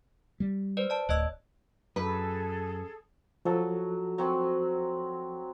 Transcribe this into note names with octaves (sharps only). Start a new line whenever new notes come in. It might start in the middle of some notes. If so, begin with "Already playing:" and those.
G3
B4 C5 D5
D5 A5
D1 C#5 D#5 E6
F#2 G#4 A4 B4
F3 F#3 A4
F#3 C4 F#4